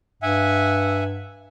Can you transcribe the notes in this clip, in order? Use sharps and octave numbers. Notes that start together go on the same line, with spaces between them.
G2 E5 F#5 G#5